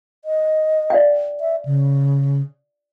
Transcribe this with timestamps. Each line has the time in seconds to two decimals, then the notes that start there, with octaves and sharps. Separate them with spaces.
0.25 D#5
0.90 D5 F5 G5
1.40 E5
1.65 C#3